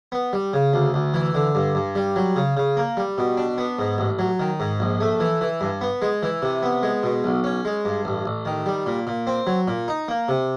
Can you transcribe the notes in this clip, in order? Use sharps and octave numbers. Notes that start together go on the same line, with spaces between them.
B3
G3
C#3
D2
D2
E3
D3
G2
G2
G3
F#3
C#3
C#3
A#3
G3
B2
D4
B3
G#2
A1
F#3
D#3
G#2
A#1
A3
E3
E3
G2
B3
G#3
E3
C3
B3
G#3
B2
B1
C#4
G#3
G2
A1
A1
D#3
G3
A#2
A#2
C4
F#3
A#2
D#4
A#3
C3